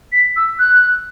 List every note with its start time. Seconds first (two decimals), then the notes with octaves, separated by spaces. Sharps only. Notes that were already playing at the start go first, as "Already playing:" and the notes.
0.12 B6
0.36 E6
0.59 F#6